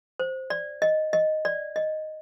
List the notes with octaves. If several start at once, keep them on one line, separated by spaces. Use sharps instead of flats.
C5
D5
D#5
D#5
D5
D#5